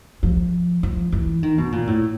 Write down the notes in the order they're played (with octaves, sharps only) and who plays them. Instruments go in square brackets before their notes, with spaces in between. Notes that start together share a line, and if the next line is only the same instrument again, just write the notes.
[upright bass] F3
F3
E3
D#3
B2
A#2
A2